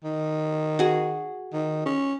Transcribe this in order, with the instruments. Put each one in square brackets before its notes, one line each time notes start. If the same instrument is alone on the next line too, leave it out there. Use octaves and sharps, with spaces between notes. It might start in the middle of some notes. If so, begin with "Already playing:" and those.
[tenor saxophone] D#3
[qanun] F#4 G#4
[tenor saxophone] D#3
C#4